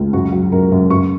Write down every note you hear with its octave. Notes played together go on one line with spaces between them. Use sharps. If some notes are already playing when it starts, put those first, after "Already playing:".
Already playing: C#2
F#2 F#4
F#3
F#2 A#4
F#2
F#2 C#6